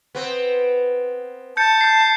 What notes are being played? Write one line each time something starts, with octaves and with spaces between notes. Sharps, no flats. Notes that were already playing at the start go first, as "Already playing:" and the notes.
B3 C4
A5 G6 C#7
G6 C7